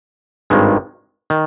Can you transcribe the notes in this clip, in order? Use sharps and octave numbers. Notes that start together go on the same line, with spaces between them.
G#1 G2 D#3 G#3
D#3